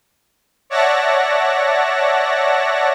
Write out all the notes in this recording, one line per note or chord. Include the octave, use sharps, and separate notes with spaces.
C#5 D5 E5 F#5 A5 A#6